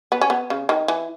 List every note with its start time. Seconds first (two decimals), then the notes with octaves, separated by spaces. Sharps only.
0.12 B3
0.21 C#4
0.30 B3
0.50 C#3
0.69 D#3
0.88 E3